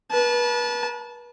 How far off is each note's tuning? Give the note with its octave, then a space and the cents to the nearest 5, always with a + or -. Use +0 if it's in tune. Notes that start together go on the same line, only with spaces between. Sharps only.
B4 -35 A5 -25